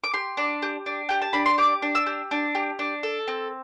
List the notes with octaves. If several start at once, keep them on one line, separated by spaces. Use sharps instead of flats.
D6
G4 C6
D4
G4
D4
G4 G5
A5
D4 B5
C6
G4 D6
D4
E6
G4
D4
G4
D4
A4
C4